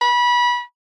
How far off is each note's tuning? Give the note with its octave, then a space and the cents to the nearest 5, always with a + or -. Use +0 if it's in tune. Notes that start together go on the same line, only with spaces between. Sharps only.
B5 -25